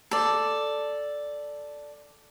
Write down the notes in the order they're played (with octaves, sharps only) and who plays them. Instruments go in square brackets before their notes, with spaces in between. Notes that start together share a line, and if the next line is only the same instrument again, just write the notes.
[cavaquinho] A4 D5